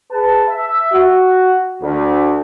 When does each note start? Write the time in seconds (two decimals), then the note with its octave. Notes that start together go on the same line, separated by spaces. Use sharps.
0.11 G#4 B4 A5
0.49 E5
0.92 F#4
1.82 D2